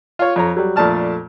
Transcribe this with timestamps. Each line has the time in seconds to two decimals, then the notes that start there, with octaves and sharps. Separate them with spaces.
0.19 F4 C#5
0.36 F2 C#5 A#5
0.56 F#3 G3
0.76 F2 A#2 A3 D4 A5 F6